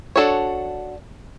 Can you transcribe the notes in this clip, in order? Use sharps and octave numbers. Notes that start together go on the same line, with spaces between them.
D4 F#4 A4 C#5